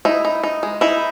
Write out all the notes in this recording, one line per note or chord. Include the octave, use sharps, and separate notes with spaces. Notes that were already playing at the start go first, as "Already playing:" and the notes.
D#4 E4
D#4
D#4
G#3
D#4 E4